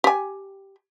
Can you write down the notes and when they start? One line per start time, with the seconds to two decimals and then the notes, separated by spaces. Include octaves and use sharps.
0.04 G4 G#5